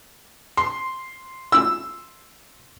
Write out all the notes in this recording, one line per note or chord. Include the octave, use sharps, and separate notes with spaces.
C6
E6